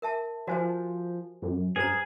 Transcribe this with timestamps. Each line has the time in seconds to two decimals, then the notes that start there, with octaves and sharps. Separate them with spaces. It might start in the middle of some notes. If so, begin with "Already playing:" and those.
0.02 A#4 E5 A5
0.47 F3 F#4 C5 G#5
1.42 F#2
1.76 G2 G#4 B4 C5 A#5